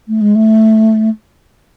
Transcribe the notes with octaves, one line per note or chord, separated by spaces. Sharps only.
A3
G#3
A3